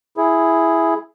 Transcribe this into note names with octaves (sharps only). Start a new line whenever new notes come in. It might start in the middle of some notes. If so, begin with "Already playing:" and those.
E4 G#4